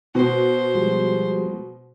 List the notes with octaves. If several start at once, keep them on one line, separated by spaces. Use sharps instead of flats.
B2 C5
F3 G3 G#3